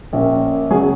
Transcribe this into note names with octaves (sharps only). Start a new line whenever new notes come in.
A#1 A#2 A#3 C#4
C#3 F#3 G#4